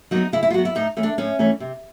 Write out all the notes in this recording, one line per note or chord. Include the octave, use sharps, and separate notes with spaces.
F#3 B3 D#4
C#3 E4
E4
F4
F#3 B3 F#4
E4
A2 D#4
E3 A3 C#4
D4
A2 C#4
E3 A3 C#4
C3